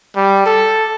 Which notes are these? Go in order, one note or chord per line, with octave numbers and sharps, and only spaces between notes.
G3
A4